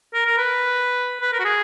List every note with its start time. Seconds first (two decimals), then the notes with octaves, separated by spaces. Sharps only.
0.14 A#4
0.26 A#4
0.38 B4
1.21 B4
1.32 A#4
1.39 F#4
1.45 G#4